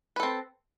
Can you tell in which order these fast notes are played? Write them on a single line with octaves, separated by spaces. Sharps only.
B4 A4 C4